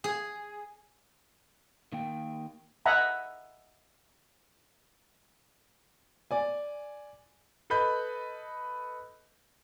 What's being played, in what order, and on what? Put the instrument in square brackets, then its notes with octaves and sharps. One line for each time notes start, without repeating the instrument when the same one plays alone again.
[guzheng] G#4
[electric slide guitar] D#3 A#3 G5
[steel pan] D#5 E5 F#5 G#5 A#5 B5
[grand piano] D5 G#5
[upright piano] A4 B4 D#5 B5 G6